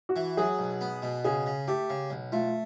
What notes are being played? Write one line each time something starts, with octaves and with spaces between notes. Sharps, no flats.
F#4
E3
F#3 G#4
B1
B3
B2
C#3 G#4
C#3
A3 G4
C#3
B1
A3 F4